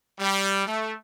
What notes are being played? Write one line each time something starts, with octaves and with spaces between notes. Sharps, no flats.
G3
A3